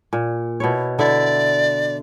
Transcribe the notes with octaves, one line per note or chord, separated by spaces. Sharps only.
A#2
B2 E4 C#5
D3 E4 D5 E5